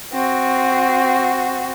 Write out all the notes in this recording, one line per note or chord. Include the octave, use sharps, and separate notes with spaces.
C4 F#4